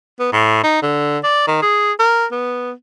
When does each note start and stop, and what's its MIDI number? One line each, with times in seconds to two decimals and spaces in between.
0.20 0.29 59
0.33 0.60 45
0.64 0.81 63
0.82 1.19 50
1.24 1.46 74
1.47 1.58 51
1.62 1.93 68
1.99 2.26 70
2.32 2.72 59